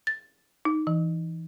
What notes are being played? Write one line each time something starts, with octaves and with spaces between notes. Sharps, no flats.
A6
D#4
E3